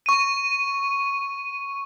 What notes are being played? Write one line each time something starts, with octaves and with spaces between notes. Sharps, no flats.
C#6 D#7